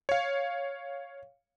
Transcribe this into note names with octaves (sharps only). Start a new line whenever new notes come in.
C#5 F5